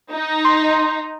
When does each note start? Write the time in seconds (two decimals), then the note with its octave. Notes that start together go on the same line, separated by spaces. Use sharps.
0.12 D#4
0.45 C6